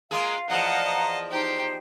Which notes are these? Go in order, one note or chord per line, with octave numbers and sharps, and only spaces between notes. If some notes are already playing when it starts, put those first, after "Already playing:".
G#3 A#3 F4 G#4 F5
E2 F3 D#5 F#5 A5 A#5
D#4 G4 C5 G5